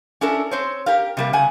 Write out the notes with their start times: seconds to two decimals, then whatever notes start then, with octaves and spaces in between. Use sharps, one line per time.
0.21 C#4 D4 E4 A4 A#4
0.51 C4 C5 C#5
0.86 G4 A#4 F5
1.17 C3 G3 A#3
1.33 C#3 F#5 G#5